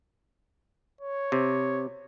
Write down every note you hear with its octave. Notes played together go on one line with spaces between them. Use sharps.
C#5
C3